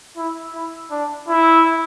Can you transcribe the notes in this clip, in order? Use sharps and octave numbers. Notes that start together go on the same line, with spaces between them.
E4
E4
D4
E4